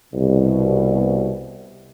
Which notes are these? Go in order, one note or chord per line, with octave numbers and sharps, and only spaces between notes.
C2 B2